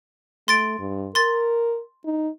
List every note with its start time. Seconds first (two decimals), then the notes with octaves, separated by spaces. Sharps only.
0.48 A3 C6 A6 D7
0.79 G2
1.15 A#4 C6 A6
2.05 D#4